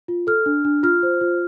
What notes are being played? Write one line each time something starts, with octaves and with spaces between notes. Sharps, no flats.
F4
A4 F6
D4
D4
F4 F6
C5
F4